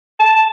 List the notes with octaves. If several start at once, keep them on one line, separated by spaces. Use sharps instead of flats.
A5